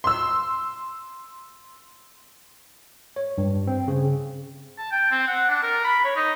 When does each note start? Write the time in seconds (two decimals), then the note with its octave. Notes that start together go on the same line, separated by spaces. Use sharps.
0.04 C6 E6
3.16 C#5
3.38 G2
3.67 C4
3.88 C#3
4.78 A5
4.91 G5
5.11 C4
5.28 F#5
5.49 D4
5.63 A#4
5.84 B5
6.05 C#5
6.16 D#4